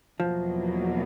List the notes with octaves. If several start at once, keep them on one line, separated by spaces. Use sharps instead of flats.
E2 B2 F3 F#3 A#3